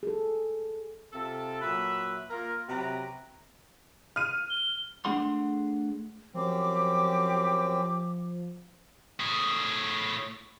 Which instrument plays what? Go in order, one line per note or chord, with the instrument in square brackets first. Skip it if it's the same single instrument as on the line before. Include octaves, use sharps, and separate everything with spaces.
[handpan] G#4 A4
[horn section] C3 F4 A4
A#2 F#3 B4 E5
A#3 F4 A#4
C3 F#3 B4 A#5
[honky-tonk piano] F6 D#7
[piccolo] G7
[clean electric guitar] A3 D4 G#4 F#5 C6
[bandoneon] F#2 C4 [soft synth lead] F3 [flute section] G4 D6
[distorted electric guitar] A2 G#4